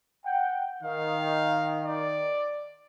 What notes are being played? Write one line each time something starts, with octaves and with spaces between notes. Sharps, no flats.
F#5 G5
D#3 F5
D5